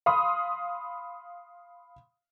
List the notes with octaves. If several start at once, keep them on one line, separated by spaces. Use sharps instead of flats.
F5 B5 C6 D#6